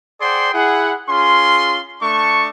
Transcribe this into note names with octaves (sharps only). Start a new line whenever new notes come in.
G#4 C5 D5 F#5 G5 C6
E4 G#4 F#5
C#4 F4 G#4 C6
A3 D4 A5 C#6